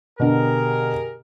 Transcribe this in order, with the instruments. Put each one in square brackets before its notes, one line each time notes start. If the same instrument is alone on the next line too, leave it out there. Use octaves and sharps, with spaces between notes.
[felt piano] B2 D3 [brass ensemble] G4 G#4 A#4